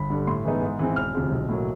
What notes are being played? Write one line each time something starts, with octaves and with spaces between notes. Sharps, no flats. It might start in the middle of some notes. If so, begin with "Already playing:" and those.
Already playing: G1 B5
G2 D3
A2 C6
E3 G#3 B3 D#4
G#2
E3 G#3 C4
E1 F6
D2 C3 F3 G#3
B1
A2 F#3 A#3